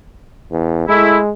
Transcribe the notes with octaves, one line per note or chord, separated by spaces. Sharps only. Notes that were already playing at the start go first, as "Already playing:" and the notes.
E2
G#3 A3 E4